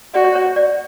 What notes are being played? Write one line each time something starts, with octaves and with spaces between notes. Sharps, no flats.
F#4 D5
C#5
C#5
C#5
D5